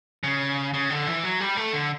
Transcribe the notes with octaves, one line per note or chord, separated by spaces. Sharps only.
C#3
C#3
D3
E3
F#3
G3
A3
D3